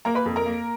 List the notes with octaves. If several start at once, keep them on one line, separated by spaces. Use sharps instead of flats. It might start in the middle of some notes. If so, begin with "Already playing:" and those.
A#3 A#4 A#5
B4 B5
F2
A#4 A#5
A#3